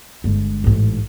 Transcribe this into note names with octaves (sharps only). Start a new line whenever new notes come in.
G1 G#3
A1 G#2